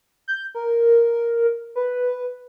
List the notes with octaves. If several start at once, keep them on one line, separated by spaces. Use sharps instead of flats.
G6
A#4
B4